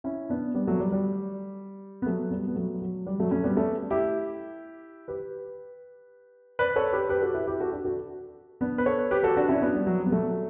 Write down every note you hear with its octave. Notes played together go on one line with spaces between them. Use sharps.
C#4 E4
B3 D4
G3 B3
F#3 A3
G3
G3
B3
F#3 A3
G3 B3
B3
F#3 A3
F#3
G3
F#3 A3
A3 C#4
G3 B3
A3 C#4
E4 G4
G4 B4
B4 D5
A4 C#5
G4 B4
G4 B4
F#4 A4
E4 G4
E4 G4
F#4 A4
D4 F#4
F#4 A4
B3 D4
B4
A4 C#5
G4 B4
F#4 A4
D4 F#4
C#4 E4
B3 D4
G3
F#3
G3
B3
F#3 A3